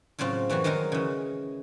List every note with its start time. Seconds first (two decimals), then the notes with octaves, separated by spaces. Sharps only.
0.19 A2 C#3 F#3 C4 F4
0.49 F#2 E3 G3 C4 F#4
0.64 D#3 F#3 G#3 D#4 A#4
0.92 C#3 E3